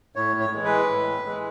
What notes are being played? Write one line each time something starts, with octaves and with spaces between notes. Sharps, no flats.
A2 C#5
C#5
E3 G#3
B4
A2
E3 G#3